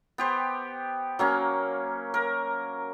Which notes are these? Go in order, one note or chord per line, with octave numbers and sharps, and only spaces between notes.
B3 G4 C5
F#3 A#3 C#4
A#4